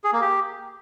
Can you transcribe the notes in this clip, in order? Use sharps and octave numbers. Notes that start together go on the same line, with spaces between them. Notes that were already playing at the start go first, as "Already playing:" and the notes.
G#4
A#3
G4